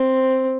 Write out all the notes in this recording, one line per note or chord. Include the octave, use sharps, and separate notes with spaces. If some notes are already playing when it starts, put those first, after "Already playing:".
Already playing: C4